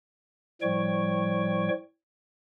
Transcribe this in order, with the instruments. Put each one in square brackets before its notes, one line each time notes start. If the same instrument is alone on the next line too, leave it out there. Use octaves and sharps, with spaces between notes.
[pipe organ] A2 F3 G3 C#5 G5 C#6